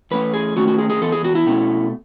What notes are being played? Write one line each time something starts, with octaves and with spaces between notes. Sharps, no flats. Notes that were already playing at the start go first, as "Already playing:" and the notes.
E3 A3 C#4 B4
G#4
D#3 A3 C#4 F#4
F#4
G#4
G#4
E3 B3 A4
G#4
F#4
E4
B2 A3 C#4